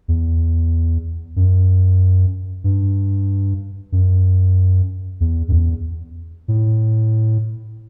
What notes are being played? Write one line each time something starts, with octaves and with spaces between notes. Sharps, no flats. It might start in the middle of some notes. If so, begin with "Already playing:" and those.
E2
F#2
G2
F#2
E2
F#2
E2
A2